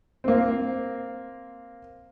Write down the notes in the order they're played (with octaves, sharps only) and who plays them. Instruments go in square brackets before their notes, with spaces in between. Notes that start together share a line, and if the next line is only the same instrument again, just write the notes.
[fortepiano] A#3 C4